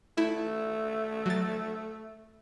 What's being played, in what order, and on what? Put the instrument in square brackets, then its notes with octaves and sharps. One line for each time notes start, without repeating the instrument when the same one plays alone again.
[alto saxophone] A3 [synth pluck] E4
[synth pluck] F#3 A6